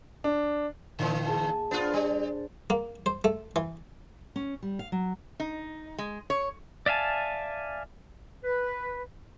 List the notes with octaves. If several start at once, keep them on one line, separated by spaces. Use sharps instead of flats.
D4
A#2 D3 E3
G#4 G#5 A5
B3 D4 F4 C5
G3
A#3
C5
A3
E3
C#4
G3
F5
F#3
D#4
G#3
C#5
D5 E5 F5 G#5 A5
B4